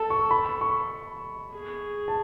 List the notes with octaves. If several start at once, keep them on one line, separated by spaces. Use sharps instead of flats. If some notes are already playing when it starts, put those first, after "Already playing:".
Already playing: A4 A5
C#6
B5
C#6
G#4
A5